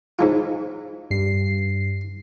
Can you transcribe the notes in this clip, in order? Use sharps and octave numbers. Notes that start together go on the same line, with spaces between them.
G#2 G#3 F4
G2 C7